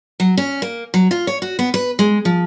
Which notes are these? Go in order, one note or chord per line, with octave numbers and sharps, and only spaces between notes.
F#3
C#4
A#3
F#3
F4
C#5
F#4
B3
B4
G#3
F3